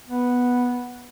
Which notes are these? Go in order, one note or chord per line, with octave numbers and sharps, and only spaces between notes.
B3